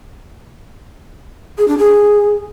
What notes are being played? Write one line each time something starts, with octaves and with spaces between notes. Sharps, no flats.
G#4
D4
G#4